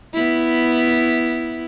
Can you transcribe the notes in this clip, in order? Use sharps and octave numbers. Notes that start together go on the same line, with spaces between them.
B3 E4